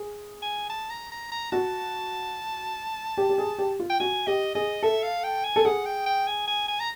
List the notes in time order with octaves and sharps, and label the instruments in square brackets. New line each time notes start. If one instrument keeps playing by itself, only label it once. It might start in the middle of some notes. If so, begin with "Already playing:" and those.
Already playing: [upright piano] G#4
[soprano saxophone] G#5
A5
A#5
A#5
A#5
[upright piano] F#4 [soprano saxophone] A5
[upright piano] G4
G4
G#4
G4
F4
[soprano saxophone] G5
[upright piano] F#4 [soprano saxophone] G#5
[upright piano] G4 [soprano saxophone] D#5
[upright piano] G#4 [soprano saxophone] D#5
[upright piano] A4 [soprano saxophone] E5
[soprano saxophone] F5
G5
G#5
[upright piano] A4
[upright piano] G#4 [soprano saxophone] F#5
[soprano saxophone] G5
G5
G#5
G#5
G#5
A#5